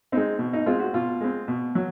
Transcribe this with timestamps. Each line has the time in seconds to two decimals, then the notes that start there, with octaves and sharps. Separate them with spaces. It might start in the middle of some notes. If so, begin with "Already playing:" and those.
0.12 G#3 C4 D#4
0.39 B2
0.53 D#4
0.66 G#3 C4 F4
0.80 F#4
0.94 B2 F4
1.21 G#3 C4
1.48 B2
1.75 F#3